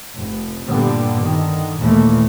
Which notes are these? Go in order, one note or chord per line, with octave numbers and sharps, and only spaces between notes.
F1
G2 A#2 D3 G3 B3
D3 D#3
D#2 A#2 E3 A3 A#3